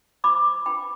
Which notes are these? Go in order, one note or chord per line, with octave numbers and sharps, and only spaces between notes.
F4 C5 B5 D6
D4 F4 B4 G5 B5